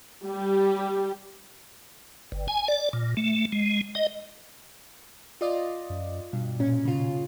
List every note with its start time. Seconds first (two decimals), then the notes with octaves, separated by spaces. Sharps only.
0.24 G3 G4
2.32 G1
2.48 G#5
2.68 D5
2.93 A#2
3.17 A3
3.52 G#3
3.95 D#5
5.41 F4 D5 D#5
5.90 F#2
6.33 G2 B2
6.59 A#2 C#4
6.85 C#3 F4